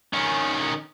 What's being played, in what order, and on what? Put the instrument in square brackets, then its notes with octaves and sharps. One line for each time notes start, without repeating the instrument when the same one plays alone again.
[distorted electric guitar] D#3 C#4